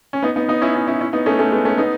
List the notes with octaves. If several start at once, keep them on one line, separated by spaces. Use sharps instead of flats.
C#4
B3 D#4
B3 D#4
B3 D#4
C#4 E4
C#4 E4
C#4 E4
C#4 E4
B3 D#4
A3 C#4
A3 C#4
G#3 B3
A3 C#4
B3 D#4